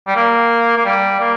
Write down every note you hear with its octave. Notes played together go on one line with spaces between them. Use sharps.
G3
A#3
A#3
G3
A#3